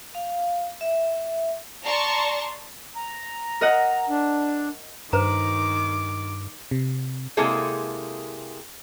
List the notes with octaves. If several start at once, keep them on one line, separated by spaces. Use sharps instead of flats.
F5
E5
D5 A5 A#5 C6 C#6
A#5
A#4 D#5 F#5
D4
G2 D#3 B4 C5 A#5 D6
C3
C3 G#3 A#3 E4 G#4 A4